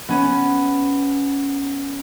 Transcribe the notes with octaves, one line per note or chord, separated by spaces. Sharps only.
B3 C#4